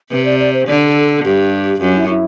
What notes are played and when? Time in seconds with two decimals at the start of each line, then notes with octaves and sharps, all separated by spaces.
0.11 C3 B4
0.25 D5
0.39 D5
0.53 C5
0.68 D3 D5
0.86 A4
1.24 G2 G4
1.81 F#2 F#4
1.96 E4
2.09 E4